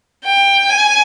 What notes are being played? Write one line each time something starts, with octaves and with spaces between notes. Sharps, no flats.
G5
G#5